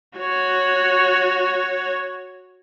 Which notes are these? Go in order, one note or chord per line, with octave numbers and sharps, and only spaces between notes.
F#4 C#5